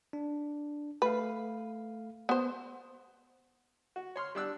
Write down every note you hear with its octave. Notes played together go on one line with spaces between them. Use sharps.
D4
A3 B4 F5
B3 C5
F#4
C#5 C6 F6
G3 D4 E6 F#6